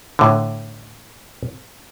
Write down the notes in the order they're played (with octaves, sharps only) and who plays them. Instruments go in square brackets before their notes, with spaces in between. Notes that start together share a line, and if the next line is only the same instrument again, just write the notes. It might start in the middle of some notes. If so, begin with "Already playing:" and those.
[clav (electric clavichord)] A2 D3